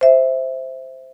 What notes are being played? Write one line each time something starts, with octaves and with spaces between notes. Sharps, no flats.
C5 E5